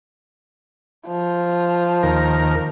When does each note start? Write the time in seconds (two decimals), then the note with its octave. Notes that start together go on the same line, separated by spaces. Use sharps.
1.08 F3
2.03 D#2 A#4